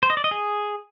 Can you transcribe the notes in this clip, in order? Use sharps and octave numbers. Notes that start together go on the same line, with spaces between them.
C5
D#5
D5
D#5
G#4